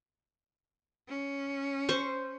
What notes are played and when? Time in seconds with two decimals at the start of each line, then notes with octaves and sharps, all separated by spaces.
1.09 C#4
1.89 C5 C#6